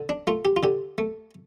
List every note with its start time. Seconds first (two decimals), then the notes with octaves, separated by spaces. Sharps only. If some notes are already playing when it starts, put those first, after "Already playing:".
Already playing: D3
0.09 D4
0.27 A3 F4
0.45 G4
0.56 F4
0.63 D3 G4
0.98 A3